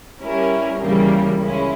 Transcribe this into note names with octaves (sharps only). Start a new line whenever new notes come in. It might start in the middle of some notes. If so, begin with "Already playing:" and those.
G3 C#4 E4 A#4
D#2 C#3 E3 G3 A#3
C#2 C#3 G#3 C#4 E4